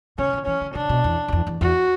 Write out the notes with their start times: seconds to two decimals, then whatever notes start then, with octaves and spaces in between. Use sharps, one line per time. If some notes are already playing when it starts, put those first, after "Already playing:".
0.18 C#3 C#4
0.33 D3
0.47 E3 C#4
0.61 D3
0.75 C#3 D4
0.89 B2
1.04 E2
1.28 F#2
1.33 E2
1.47 E2
1.61 E2 F#4